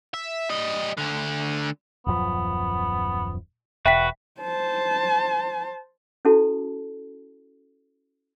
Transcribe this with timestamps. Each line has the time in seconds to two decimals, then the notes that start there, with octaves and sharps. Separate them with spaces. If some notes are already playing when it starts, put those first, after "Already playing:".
0.14 E5
0.50 G3 D#5
0.98 D2 D3
2.07 D#1 F#2 F3 B3
3.86 E1 F#4 B4 E5 G5 B6
4.41 C5 A5
6.25 C#4 E4 F#4 A4 A5